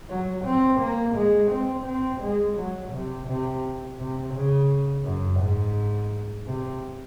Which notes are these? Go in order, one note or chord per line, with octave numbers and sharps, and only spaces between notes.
F#3
C4
A#3
G#3
C4
C4
G#3
F#3
C3
C3
C3
C#3
F#2
G#2
C3